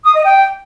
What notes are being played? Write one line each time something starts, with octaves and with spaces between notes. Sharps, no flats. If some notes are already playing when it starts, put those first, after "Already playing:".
D#6
D#5
G5